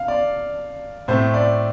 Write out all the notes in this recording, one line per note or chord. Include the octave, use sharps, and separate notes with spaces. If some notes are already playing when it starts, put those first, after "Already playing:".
Already playing: F5
D5
A2 A3 C4 C5
D5